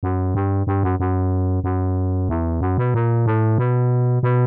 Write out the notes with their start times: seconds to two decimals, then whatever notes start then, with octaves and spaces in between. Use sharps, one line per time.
0.03 F#2
0.35 G2
0.67 G2
0.83 F#2
1.00 F#2
1.64 F#2
2.29 E2
2.61 F#2
2.78 B2
2.94 A#2
3.26 A2
3.58 B2
4.23 B2